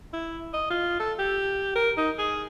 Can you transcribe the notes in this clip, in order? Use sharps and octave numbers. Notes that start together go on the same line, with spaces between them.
E4
D#5
F4
A4
G4
A#4
D#4
G#4